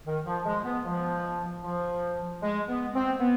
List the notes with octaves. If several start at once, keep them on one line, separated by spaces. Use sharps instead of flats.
D#3
F3
G#3
B3
F3
F3
G#3
B3
C4
B3